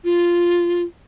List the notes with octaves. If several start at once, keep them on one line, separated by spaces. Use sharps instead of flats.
F4